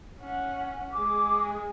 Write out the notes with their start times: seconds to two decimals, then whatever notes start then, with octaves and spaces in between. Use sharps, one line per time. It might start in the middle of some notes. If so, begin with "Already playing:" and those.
0.20 C#4 F#5
0.93 G#3 G#4 D6